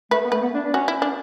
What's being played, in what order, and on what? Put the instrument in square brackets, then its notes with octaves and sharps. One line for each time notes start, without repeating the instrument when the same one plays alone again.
[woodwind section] A3 [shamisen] B4
[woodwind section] B3
[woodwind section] A3 [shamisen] B4
[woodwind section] B3
D4
D4
[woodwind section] C#4 [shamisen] F#4
[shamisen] E4
D4